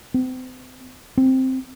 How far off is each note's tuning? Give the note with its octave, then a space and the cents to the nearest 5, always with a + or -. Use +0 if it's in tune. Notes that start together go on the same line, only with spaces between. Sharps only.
C4 -40
C4 +0